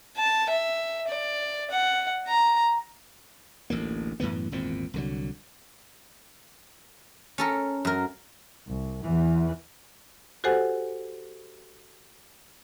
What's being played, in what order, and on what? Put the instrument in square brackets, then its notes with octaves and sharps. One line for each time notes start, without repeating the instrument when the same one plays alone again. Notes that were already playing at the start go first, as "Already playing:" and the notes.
[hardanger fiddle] A5
E5
D5
F#5
A#5
[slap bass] A1 D2 A#3
F#2 A2 E3 B3
G#1 E2 A#2 C4
C2 D3 F#3
[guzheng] C#4 A4 A#4
F#2 A#4
[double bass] C2
E2 E3
[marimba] F#4 G4 A4 C5 F#5 G#5